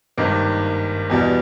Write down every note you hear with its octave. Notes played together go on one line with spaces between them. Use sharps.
G#1 G2 D#3 A#3
E2 B2 G3